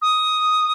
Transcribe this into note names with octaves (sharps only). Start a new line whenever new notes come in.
D#6